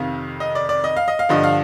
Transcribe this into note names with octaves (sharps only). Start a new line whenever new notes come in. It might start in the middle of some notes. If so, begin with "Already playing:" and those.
Already playing: F2 C3 D#3 F5
D#5
D5
D5
D#5
F5
D#5
F5
G2 D3 F3 D#5
F5